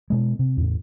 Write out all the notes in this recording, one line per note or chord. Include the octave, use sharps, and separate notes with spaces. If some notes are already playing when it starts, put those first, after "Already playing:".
B2 G#3
C3
E2 A2